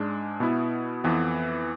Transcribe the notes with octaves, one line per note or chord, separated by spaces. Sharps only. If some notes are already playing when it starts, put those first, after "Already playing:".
Already playing: G#2 G#3 D4
B2 B3 E4
F2 E3 B3